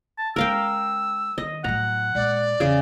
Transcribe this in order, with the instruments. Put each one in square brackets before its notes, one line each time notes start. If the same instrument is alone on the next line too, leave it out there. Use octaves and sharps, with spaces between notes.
[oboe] A5
[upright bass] G#3 C#4 [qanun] A#4 F5 G5 [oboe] E6
[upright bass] D#3 [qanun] D#5
[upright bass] A2 F#3 [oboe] F#5 [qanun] A#5
[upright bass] A#2 G#3 [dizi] D5
[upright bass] E2 [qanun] C#3 G#4 D6